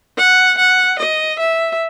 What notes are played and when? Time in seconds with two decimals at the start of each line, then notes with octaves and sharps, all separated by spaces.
0.17 F#5
0.58 F#5
0.99 D#5
1.39 E5